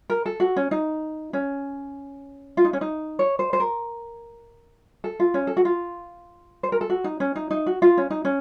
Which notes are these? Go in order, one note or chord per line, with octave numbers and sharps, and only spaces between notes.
A#4
A4
F#4
C#4
D#4
C#4
F4
D#4
C#4
D#4
C#5
C5
C5
A#4
A4
F4
C#4
A4
F#4
F4
C5
A#4
A4
F#4
D#4
C#4
D#4
D#4
F#4
F4
C#4
D#4
C#4